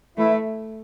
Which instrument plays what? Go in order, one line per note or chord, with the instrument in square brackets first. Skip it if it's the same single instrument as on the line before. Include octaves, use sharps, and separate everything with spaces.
[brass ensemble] E3 E4 [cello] A3